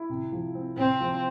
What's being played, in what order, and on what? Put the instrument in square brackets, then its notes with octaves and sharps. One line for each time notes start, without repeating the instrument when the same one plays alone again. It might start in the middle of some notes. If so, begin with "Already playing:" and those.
Already playing: [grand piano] E4
C3
F3
C4
[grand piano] C3 [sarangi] C4
[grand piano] F3